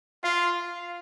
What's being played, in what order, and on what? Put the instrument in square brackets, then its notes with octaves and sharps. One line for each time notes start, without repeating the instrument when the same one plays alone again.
[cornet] F4 [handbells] F5